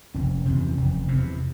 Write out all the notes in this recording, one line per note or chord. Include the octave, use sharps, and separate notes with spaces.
F1 C#4
E2 C3
F1
E2 C3